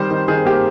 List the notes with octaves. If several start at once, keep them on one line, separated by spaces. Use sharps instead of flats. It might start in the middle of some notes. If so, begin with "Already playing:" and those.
Already playing: D#3 G3 C5
D#3
D#3 G#4
A#3 G4